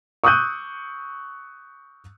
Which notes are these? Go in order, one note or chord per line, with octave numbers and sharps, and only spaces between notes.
C#6 D#6 E6 F#6 G6 D#7